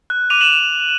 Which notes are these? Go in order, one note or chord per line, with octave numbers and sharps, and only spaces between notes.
F#6
D6 D#7 F7
E7 F#7